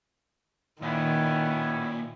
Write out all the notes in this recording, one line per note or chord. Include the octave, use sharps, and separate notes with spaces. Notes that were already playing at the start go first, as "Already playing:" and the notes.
A#2 D#3 B3 C#4 E4